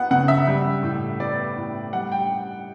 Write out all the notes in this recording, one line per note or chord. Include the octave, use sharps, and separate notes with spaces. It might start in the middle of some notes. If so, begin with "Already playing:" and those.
Already playing: B3 F#5
C#3 F#5
E5
G3
A2
B3 D5
A2
G3 F#5
G5